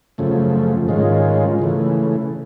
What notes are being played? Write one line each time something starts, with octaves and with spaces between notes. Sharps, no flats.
F#2 C#3 F3 A3
G#2 D#3 G#3 C#4 F4
C#3 E3 A3